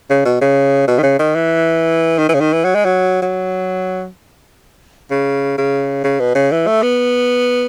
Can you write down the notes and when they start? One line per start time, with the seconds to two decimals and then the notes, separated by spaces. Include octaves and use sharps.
0.10 C#3
0.25 B2
0.41 C#3
0.88 B2
0.99 D#3
1.03 C#3
1.19 D#3
1.35 E3
2.18 D#3
2.29 E3
2.34 C#3
2.40 D#3
2.53 E3
2.64 F#3
2.75 G#3
2.85 F#3
3.22 F#3
5.11 C#3
5.58 C#3
6.04 C#3
6.20 B2
6.35 C#3
6.52 E3
6.67 A3
6.83 B3